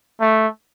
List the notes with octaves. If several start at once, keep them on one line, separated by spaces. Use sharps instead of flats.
A3